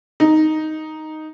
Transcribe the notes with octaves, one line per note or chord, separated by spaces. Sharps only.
D#4